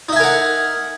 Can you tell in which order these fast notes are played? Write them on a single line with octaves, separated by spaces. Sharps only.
D#4 E5 G#5 A#4 F#5